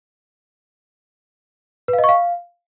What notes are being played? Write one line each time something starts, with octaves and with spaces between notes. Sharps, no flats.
B4
F5
D#5
C#6
F5